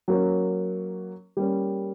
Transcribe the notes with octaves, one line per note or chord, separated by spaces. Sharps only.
F#3 A#3 C#4
G3 A#3 C#4